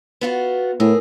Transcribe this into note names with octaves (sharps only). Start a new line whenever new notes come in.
B3 F4 F#4
A2 E4 G#4 A#4